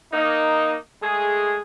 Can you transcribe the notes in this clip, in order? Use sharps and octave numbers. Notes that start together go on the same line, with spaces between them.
A#3 D#4
G#3 A3 G#4